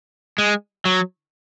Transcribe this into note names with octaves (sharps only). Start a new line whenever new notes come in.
G#3
F#3